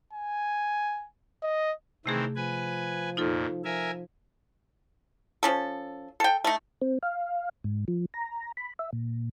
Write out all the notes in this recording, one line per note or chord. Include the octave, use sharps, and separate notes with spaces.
G#5
D#5
C3 D#3 E3 A3 C4 G#4
F3 B4 G#5
F2 A#2 D#4 F4 A4
F3 A#4 E5 G#5
F3 C#4 A4
A4 G5
A3 D#4
C4
F5
G#2
F3
A#5
B5
E5
A#2